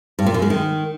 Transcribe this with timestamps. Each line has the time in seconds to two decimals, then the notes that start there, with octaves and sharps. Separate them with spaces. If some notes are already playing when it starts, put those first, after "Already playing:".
0.19 G2
0.26 A#2
0.34 F#2
0.42 G#3
0.50 D#3